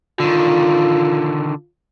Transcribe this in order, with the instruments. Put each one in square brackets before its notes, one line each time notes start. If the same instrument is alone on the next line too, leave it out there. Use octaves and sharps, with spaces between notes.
[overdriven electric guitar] D3 D#3 [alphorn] F4